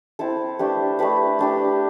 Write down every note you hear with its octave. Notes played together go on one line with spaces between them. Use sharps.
C4 E4 A4
A3 D4 G4 B4
A3 D4 G4 B4
A3 D4 G4 B4